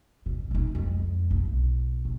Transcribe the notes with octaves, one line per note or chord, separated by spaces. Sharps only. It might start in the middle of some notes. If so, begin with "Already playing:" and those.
B2
A#1 D#4
F2 G#3
B1
D3